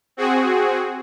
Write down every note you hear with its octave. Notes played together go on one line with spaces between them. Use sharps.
C4 F#4 G#4